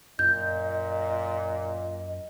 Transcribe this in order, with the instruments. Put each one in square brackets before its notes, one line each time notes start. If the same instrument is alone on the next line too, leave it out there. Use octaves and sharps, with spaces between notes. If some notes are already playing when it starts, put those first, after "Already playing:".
[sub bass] F#2 [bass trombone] A#2 [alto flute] D#5 [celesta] G6